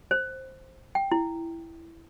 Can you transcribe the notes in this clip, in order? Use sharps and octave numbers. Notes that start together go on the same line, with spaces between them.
C5
G5
E4